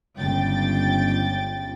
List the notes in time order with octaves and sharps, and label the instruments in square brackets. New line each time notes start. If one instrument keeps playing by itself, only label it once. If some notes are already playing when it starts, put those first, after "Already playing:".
[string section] G1 C#2 G5 A6